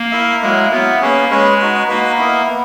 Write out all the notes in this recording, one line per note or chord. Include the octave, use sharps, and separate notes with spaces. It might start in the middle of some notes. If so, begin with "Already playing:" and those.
Already playing: A#3
E4 A#4 E5
F#3 G#3 A#3 E4 A#4
F#3 A#3 B3 E4 A#4
A#3 C#4 G#4 B4
G#3 C#4 G#4 B4
D#4 F#4 B4
A#3 D#4 F#4 B4
B3 E4 A#4 D#5
B3